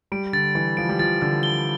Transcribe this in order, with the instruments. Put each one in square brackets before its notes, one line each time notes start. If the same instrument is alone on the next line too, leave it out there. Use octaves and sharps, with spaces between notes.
[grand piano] G3 [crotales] D7
[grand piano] D3 [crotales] A6
[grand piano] E3 [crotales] A6
[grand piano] F3 [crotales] D7
[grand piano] G3
[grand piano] F3 [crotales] A6
[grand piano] D3 [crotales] A6
[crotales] G7